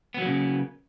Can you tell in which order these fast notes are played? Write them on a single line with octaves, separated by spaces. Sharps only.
B3 F#3 A#3 C#3